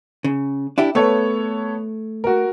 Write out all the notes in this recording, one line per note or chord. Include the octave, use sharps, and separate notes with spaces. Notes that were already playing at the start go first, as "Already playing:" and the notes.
C#3
D4 E4 G4
A3 B3 A4 C#5
F#4 A#4